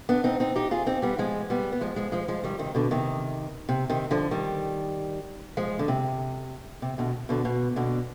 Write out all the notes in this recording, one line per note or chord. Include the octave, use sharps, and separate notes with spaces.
B3 D4
C4 D#4
C4 D#4
D#4 G4
F4 G#4
C4 D#4
G3 B3
F3 G#3
G3 B3
B3
F3 G#3
F3 G#3
F3 G#3
F3 G#3
D#3 G3
C3 D#3
B2 D3
C3 D#3
C3
C3 D#3
D3 F3
D#3 G3
F3 G#3
D3
C3
C3
B2 D3
B2 D3
B2
B2 D3